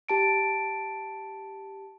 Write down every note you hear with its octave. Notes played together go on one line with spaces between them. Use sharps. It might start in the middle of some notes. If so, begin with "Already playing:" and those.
G4 A5 D7